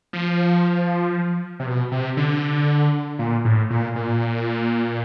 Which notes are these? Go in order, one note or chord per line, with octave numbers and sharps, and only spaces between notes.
F3
C3
B2
C3
D3
A#2
A2
A#2
A#2